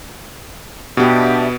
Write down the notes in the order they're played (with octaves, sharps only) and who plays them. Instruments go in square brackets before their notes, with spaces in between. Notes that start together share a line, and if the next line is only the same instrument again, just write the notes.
[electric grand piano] B2 B3 [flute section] D4 G4 E5